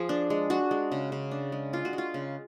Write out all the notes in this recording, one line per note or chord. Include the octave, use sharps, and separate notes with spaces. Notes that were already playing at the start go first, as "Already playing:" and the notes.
Already playing: F3 G#4
D4
G#3
D4 F#4
G#3
C#3
C#3
D4
G#3
D4 F4
F#4
G#3
F4
C#3